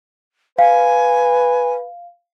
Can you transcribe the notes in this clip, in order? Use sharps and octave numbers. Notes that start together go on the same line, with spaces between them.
B4 F5 G#5